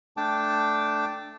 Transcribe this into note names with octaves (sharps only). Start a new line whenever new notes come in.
A3 D4 G5 A5 D6